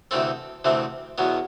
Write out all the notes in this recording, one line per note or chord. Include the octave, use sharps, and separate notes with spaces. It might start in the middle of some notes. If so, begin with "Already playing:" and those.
D2 C3 E3 A3 C4 A4
D2 C3 E3 A3 C4
E2 B2 F#3 B3